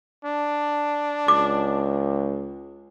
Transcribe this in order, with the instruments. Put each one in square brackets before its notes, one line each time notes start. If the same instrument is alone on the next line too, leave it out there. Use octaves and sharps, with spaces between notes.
[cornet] D4
[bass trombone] C#2 [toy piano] D6